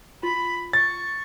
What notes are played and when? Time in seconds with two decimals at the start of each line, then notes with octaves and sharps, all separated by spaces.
0.23 F4 B5
0.73 C#6 A6